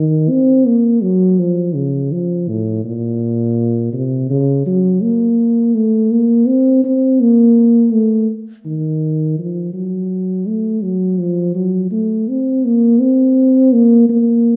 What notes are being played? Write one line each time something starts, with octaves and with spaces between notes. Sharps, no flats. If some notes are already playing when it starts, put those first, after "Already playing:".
Already playing: D#3
C4
A#3
F#3
F3
C#3
F3
A2
A#2
C3
C#3
F#3
A#3
A3
A#3
C4
C4
A#3
A3
D#3
F3
F#3
A3
F#3
F3
F#3
A3
C4
A#3
C4
A#3
A#3